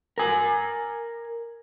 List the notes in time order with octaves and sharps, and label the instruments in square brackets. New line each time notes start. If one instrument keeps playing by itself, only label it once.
[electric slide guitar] A#4 G#5